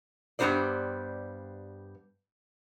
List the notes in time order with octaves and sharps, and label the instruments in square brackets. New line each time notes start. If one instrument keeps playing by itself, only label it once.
[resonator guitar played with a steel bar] G2 G3 B3 F4 C5 D5